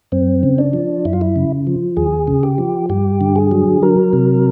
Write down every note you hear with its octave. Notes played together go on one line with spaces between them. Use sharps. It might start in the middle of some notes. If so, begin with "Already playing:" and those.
F#2 C4
C#3
D4
F3
F#2 E4
F4
E4
C#3
F3
D#2 G#4
C#3
G4
F3
G2 G4
D3
G#4
F#3
F#3 A#4
C3